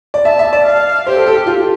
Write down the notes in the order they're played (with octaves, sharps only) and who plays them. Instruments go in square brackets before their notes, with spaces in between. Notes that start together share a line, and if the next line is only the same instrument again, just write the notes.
[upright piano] D5
[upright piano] E5 [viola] A5
[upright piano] E5
D5
[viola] F5
[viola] G4 [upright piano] C5
[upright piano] A4
A4
G4
F4